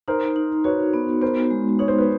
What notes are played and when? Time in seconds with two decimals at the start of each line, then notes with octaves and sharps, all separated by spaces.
0.08 D#4 A#4 C5
0.36 D#4
0.64 F#4 B4 C#5
0.94 B3
1.22 B3 A#4 C5
1.50 G#3
1.79 D#4 C#5
1.88 C5
1.98 B4